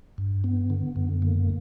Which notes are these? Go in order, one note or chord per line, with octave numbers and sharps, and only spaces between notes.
G2
B3
D3
F#2
A#3